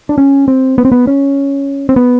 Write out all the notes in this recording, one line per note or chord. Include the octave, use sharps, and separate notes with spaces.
D4
C#4
C4
B3
C4
B3
C#4
C4
B3